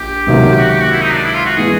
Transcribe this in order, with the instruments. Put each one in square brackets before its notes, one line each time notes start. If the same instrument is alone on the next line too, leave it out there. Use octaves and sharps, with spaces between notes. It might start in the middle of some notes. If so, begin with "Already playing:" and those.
Already playing: [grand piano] A#1 [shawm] G4
[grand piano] C#2 C3 D#3 F#3 A#3
[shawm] F#4
G4
F#4
E4
D#4
D4
E4
F4
F#4
[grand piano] E3 G#3 [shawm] G#4